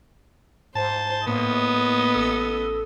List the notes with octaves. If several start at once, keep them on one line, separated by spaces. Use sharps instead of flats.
G#2 C5 A5
A2 A#3 B3 D#5
A1 A4 E6